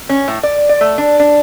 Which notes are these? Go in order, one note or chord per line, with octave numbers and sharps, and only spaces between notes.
C#4
A2
D5
D5
A3
D4
D4